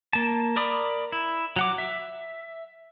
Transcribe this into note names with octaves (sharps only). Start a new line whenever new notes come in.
A#3 A5
A#4 D5 B5 D#6
E4
F#3 F#5 D6
E5